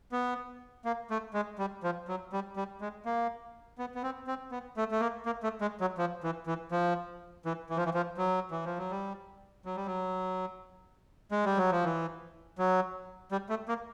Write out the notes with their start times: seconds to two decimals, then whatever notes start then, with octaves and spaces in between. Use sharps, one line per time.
0.12 B3
0.85 A#3
1.11 A3
1.34 G#3
1.59 G3
1.83 F3
2.08 F#3
2.33 G3
2.56 G3
2.81 G#3
3.05 A#3
3.78 B3
3.95 B3
4.03 C4
4.27 C4
4.51 B3
4.77 A3
4.92 A3
5.00 A#3
5.26 A#3
5.43 A3
5.61 G#3
5.81 F#3
5.98 F3
6.23 E3
6.47 E3
6.72 F3
7.46 E3
7.70 E3
7.77 F3
7.85 E3
7.94 F3
8.18 F#3
8.51 E3
8.65 F3
8.78 F#3
8.91 G3
9.65 F#3
9.76 G3
9.86 F#3
11.31 G#3
11.45 G3
11.57 F#3
11.71 F3
11.84 E3
12.58 F#3
13.32 G3
13.49 A3
13.68 A#3